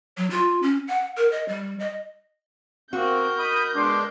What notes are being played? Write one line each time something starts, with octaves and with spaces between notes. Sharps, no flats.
F#3
F4
C#4
F#5
A#4
D#5
G3
D#5
A#3 C4 F#4 A#4 G6
D#5 B5 D#6
G#3 B3 D4 C6 D6